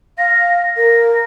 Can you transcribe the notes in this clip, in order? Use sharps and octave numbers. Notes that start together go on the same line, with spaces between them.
F5 A#6
A#6
A#4